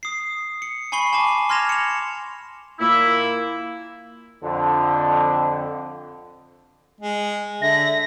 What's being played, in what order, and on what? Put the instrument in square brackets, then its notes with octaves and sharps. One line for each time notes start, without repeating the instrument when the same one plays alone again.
[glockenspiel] D#6 C7
C#7
G#5 B5 C#6 C7 G7
G#5 A5 D6
C6 F6 G#6 A#6 E7 F7
C#7 F7
[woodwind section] A#2 A#3 E4
[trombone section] F2 D3
[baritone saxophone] G#3
[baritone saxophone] D3 [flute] E5 [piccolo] A#6